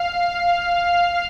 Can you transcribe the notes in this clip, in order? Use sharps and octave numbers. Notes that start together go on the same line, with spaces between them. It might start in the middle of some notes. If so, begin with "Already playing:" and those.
Already playing: F5